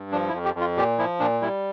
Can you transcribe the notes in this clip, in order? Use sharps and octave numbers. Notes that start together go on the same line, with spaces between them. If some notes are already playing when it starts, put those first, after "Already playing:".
Already playing: G2
F3 D4
E4
F2
G4
F2
F4
A#2 G4
F3 E4
A#2 D4
G3 E4